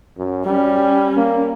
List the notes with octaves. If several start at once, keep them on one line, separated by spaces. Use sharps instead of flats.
F#2
G3 C#4
A#3